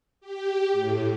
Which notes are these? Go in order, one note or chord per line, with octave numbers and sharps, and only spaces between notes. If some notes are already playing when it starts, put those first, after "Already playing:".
G4
A2